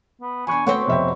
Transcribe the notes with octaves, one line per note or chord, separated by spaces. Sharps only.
B3
E2 D4 G#5 B5 C#6 F#6
D2 A3 B3 C4 F#4 C#5 F#5 C6
F1 E5 G5